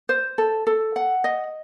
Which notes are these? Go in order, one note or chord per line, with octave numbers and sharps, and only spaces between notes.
C5
A4
A4
F#5
D#5